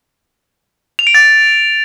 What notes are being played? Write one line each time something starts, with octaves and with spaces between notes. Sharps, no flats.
F7
D7
A6